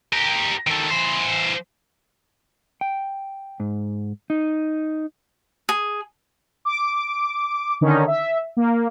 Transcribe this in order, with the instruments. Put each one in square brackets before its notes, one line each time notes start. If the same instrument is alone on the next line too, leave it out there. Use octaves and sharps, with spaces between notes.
[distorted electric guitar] G4 A#4
D#3 A3
E3 C5
[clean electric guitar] G5
G#2
D#4
[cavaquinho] G#4
[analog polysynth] D6
D3 D#3 C#4 D#4
E5
A#3